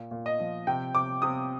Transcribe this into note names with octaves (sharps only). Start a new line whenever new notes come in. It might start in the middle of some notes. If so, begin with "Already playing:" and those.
Already playing: A#2
A#2
D#5
F3
C3 G5
C3 D6
C3 D#6